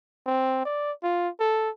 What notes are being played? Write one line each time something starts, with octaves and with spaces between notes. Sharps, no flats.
C4
D5
F4
A4